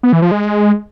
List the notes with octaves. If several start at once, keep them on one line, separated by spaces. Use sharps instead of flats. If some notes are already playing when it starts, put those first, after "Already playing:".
B3
E3
F3
G#3